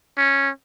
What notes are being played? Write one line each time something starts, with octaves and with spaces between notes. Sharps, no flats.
C#4